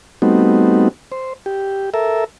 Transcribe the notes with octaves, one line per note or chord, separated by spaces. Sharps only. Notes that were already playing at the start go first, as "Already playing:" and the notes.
G3 A3 B3 C4 D#4 F#4
C5
G4
A4 A#4 E5